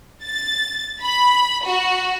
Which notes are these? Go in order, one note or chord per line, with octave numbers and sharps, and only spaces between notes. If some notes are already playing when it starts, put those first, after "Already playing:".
A6
B5
F#4